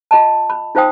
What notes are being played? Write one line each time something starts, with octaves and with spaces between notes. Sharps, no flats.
F4 D#5 A5
B5
D#4 F4 C5 F5 G5 D#6